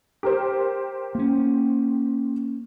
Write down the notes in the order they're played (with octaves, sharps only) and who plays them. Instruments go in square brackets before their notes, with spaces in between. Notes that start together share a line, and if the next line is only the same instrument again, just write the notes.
[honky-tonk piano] G4 A#4 C5
[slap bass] A#3 C#4